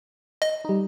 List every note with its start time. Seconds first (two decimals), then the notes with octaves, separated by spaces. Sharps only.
0.42 D#5
0.65 G3 D#4